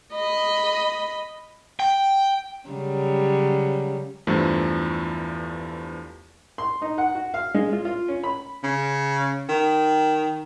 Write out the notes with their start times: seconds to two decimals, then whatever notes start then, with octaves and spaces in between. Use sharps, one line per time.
0.13 D#5 B5
1.80 G5
2.69 C#3 F#3 G3
4.27 E2 G2 F3 A3
6.58 C6
6.82 D#4
6.98 F#5
7.15 F#4
7.34 F5
7.54 G#3
7.73 F4
7.85 F4
8.08 C#4
8.24 B5
8.63 C#3
9.49 D#3